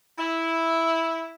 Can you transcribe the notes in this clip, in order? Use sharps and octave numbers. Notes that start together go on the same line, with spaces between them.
E4